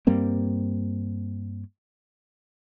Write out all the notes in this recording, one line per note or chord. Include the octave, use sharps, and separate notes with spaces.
G2 G3 A#3 C4